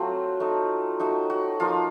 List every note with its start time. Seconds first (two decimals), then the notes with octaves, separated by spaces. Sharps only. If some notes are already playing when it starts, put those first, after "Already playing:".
Already playing: F#3 A3 C4 F4 F#4
0.40 A3 D#4
0.99 A3 D#4 F#4
1.30 F#4
1.60 F3 A#3 D#4 F4